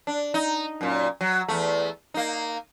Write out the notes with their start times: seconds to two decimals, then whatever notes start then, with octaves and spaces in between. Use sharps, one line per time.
0.07 D4
0.34 D#4
0.81 F#2 A#2
1.21 F#3
1.48 E2 A3
2.14 A#3 D#4